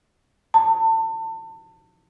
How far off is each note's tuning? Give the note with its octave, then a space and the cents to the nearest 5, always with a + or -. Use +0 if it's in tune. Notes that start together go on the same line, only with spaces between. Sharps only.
A5 +30